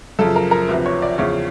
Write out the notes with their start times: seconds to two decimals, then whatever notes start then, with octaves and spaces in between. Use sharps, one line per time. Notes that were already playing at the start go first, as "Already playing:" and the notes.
0.19 F#2 C#3 F3 A4
0.36 A#4
0.51 A#4
0.68 D2 C3 F3 B4
0.86 C#5
1.02 D5
1.18 E2 C#3 F3 C#5